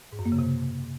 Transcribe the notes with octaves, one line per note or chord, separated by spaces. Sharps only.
G#2
F#2
A#3
C#3
C3